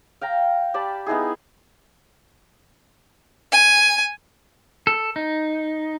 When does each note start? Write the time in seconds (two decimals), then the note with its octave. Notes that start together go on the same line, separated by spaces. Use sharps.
0.21 F5 G5 A#5
0.74 G4 D5 A5 B5
1.06 B3 D#4 E4 G#4
3.51 G#5
4.87 A4
5.16 D#4